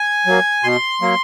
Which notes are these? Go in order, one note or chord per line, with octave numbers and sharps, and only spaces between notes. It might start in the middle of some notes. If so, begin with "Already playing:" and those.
Already playing: G#5
F#3 A#3
B2 C6
F#3 A#3